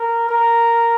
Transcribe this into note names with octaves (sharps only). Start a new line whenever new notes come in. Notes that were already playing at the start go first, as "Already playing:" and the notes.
Already playing: A#4
A#4